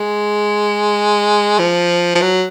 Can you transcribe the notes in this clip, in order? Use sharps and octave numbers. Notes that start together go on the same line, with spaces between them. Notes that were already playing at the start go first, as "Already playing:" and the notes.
Already playing: G#3
F3
F3
F#3